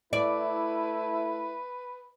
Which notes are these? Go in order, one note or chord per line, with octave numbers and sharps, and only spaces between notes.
A3 E4 B4 D5